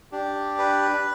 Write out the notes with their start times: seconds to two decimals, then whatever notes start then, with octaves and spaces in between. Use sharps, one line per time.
0.12 D4 G4
0.58 B4